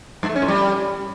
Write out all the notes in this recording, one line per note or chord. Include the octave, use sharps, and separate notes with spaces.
G2
A3
C#4
A2
G3